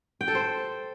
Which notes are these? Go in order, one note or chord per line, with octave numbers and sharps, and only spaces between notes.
G5
A4
C5